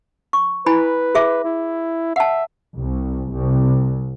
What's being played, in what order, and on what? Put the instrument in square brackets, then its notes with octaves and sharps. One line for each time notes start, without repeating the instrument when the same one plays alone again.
[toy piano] C#6
[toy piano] E4 G#5 B5 [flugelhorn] B4
[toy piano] G#4 E5 D6
[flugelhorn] E4
[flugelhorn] E5 [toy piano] F#5 A5
[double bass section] C2
C2